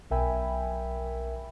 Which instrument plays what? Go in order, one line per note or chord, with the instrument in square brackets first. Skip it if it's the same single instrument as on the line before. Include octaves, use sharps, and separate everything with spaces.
[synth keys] B1 A#4 E5 G5 G#5 B5